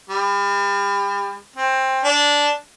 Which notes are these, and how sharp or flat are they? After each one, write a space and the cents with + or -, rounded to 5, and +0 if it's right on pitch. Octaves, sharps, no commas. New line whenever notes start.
G3 +35
C4 +15
D4 -10